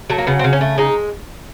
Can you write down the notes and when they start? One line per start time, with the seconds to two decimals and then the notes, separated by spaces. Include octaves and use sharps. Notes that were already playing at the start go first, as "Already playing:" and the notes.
0.10 F#3 A3
0.18 A#3
0.27 C#3 B3
0.39 C4
0.44 C#3
0.53 C#4
0.61 A3
0.78 G#3 D#4